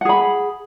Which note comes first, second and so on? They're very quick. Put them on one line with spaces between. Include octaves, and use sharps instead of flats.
F#5 G#4 B5